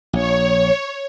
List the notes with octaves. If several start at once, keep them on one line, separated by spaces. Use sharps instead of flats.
A#1 C#5